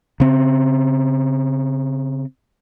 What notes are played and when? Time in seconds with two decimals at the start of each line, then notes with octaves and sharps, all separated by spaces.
0.20 C#3 C4